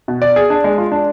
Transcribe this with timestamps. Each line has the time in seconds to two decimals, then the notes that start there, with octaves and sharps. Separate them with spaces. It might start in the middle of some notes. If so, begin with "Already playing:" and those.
0.08 B2
0.22 D5
0.36 G#4
0.50 D4
0.64 G#3
0.78 F4
0.92 D4